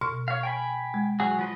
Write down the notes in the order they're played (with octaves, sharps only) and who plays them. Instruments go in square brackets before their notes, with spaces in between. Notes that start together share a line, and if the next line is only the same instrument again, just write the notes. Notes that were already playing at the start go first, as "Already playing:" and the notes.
[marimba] B2 C#6 F6
[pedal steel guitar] C#5 F5
G5 G#5 B5
[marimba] G#3
[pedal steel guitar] F#3 F#4 G#4
F3 B4 D#5